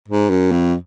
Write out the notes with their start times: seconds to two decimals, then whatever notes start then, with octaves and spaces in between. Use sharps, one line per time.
0.08 G#2
0.30 F#2
0.51 F2